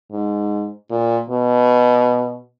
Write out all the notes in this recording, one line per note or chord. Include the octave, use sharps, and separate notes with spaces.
G#2
A#2
B2